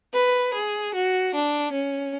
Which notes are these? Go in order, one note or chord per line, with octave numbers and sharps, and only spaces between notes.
B4
G#4
F#4
D4
C#4